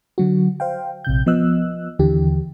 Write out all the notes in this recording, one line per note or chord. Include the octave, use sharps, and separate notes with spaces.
D3 F#3 F#4
C5 F5 G5
A#1 C3 G6
F3 B3 D#5 E6 F#6
D#2 D3 E3 G4